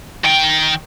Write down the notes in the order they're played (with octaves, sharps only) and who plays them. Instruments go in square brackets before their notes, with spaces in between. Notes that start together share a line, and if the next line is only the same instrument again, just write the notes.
[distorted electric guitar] D#3 G5